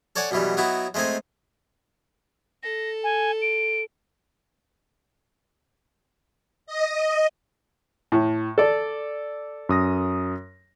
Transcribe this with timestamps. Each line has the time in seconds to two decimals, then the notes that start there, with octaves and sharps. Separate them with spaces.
0.16 A4 C#5 D5 F#5 G#5
0.31 F#2 B2 E3 F#3 G3
0.57 F#3 B3 D#4 E4 F#4
0.94 G#3 A3 C4 D#4 G#5
2.63 A4 A#6
3.04 G#5
3.42 D7
6.66 D#5
8.12 A2
8.58 A4 D5
9.69 F#2 D#6 A#6